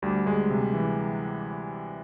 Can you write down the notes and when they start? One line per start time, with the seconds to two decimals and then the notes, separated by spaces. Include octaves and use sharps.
0.02 D2 G3
0.26 D2 G#3
0.51 C3
0.74 E3